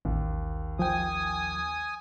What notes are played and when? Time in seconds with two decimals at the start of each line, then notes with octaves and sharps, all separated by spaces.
0.05 A1 D#2
0.79 F3 G5 G#5 D#6